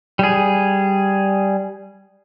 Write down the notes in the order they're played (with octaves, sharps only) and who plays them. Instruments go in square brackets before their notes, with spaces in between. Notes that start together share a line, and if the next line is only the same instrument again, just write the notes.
[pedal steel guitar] G3 G#4